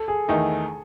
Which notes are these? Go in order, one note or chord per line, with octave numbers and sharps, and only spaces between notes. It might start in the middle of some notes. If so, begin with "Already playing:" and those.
Already playing: A4
G#4
E2 D#3 A3 D#4 G#4